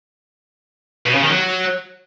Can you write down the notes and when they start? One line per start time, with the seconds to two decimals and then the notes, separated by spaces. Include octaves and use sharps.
1.06 B2
1.14 C#3
1.23 D#3
1.31 F#3